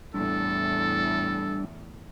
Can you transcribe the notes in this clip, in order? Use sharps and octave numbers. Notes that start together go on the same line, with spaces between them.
E2 A2 G3 D4 A4